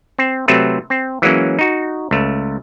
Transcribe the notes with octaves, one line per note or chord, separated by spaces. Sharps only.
C4
C3 F#3 A3 C4 A4 B4
C4
E3 F#3 G#3 A#3 C#4
D#4 F#4
C#2 A3